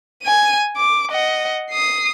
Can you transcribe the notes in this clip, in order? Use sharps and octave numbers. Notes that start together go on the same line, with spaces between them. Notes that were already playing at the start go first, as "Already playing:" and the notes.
G#5 D#7
D6
D#5 F#5
D#6 C7